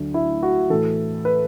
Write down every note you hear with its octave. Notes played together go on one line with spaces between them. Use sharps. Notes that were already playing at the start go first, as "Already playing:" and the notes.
Already playing: D2 D3 F#3
E4
F#4
A2 E3 A4
B4